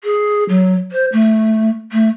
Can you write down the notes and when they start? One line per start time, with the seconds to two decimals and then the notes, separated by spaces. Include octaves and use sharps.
0.04 G#4
0.49 F#3
0.92 C5
1.12 A3
1.92 A3